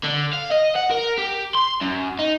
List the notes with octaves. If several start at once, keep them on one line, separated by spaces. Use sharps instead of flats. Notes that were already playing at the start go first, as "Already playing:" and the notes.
D3
F5
D#5
F#5
A#4
G4
C6
F#2
D#4